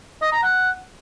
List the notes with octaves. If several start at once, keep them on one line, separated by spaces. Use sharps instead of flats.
D#5
A#5
F#5